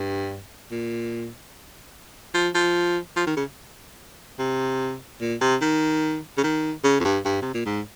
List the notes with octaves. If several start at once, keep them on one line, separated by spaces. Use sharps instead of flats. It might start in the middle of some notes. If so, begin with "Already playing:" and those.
Already playing: G2
A#2
F3
F3
F3
D#3
C#3
C3
A#2
C3
D#3
C#3
D#3
C#3
F2
G2
G2
C3
A#2
G#2